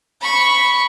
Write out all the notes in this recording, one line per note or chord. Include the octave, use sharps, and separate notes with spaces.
B5 C#6